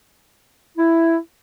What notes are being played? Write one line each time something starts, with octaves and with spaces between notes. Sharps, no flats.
E4